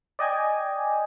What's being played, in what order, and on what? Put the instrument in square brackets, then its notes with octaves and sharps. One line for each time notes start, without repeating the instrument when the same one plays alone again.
[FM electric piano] D5 D#5 G5 G#5